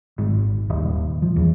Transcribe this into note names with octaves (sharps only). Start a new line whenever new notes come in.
G#1
D#1
F3
E2